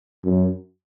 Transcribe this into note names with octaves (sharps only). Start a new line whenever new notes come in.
F#2